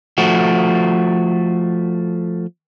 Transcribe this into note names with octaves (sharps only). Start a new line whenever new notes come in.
F3 A3 F#4